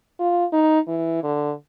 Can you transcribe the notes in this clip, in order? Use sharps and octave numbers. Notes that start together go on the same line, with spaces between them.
F4
D#4
E3
D3